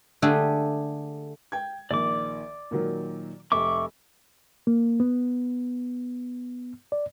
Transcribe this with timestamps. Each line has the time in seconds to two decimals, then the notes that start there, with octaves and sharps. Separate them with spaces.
0.22 D3 A3 G4 G#4
1.52 G5 G#6
1.91 A#1 D#3 D5 D6
2.71 A#2 D#3 F#3
3.52 F1 E5 C#6 D6
4.67 A#3
5.00 B3
6.92 D5